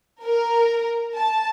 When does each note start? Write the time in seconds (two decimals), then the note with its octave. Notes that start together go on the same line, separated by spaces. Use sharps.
0.23 A#4
1.16 A5